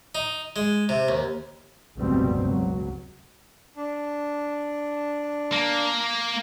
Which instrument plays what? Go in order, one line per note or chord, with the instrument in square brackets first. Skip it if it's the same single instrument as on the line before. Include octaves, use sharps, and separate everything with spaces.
[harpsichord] D#4
G#3
C3
D#2
[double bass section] F1 C#2 G2 B2 G3 C4
C#2 F#3
[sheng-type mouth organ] D4
[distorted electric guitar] A#3